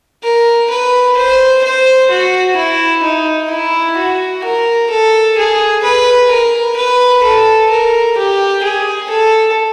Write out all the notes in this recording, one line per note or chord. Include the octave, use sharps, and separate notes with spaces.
A#4
B4
C5
C5
F#4
E4
D#4
E4
F#4
A#4
A4
G#4
B4
A#4
B4
A4
A#4
G4
G#4
A4